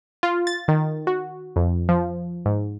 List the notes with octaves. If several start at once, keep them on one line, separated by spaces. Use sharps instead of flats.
F4
A6
D#3
F#4
F2
F3
G#2